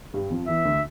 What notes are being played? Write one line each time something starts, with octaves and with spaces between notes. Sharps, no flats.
G2 G3
F2 F3
E2 E3 E5
D2 D3